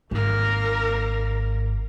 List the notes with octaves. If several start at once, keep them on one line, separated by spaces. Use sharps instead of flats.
G#1 A#3 A#4